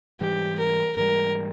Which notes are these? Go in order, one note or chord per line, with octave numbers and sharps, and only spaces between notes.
G#2 E3 G3 G4
A#4
G#2 E3 G3 A#4